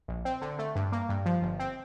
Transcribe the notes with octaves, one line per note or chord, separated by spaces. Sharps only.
A#1
C4
D3
A3
G2
A#3
G2
F3
G1
C4